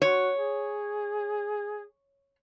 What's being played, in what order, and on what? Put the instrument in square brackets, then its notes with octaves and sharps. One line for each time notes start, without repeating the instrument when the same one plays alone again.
[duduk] F#4 [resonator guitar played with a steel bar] C#5
[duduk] G#4